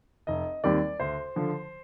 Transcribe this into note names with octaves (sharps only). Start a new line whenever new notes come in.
F1 D#5
D#2 D#3 G3 C4 D5
D2 C5
D3 F3